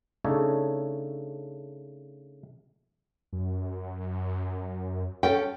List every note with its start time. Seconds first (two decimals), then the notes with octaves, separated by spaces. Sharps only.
0.24 C#3 A3 D4 D#4 A4 C#5
3.33 F#2
5.23 C#4 A4 G5